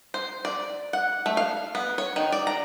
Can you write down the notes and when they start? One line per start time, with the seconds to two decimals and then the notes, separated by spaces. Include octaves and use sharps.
0.14 C5
0.45 D5
0.93 F#5
1.26 A3
1.37 F5
1.75 B3
1.98 C#5
2.16 D#3
2.32 D5
2.47 A#5